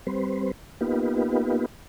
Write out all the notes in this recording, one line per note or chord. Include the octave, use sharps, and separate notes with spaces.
G3 C4 B4 C5
A#3 B3 D#4 F4 G4 B4